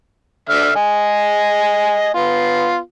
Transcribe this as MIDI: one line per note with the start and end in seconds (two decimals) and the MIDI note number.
0.49 0.71 50
0.49 0.71 76
0.49 0.71 89
0.76 2.14 75
0.76 2.14 80
2.14 2.78 59
2.14 2.78 65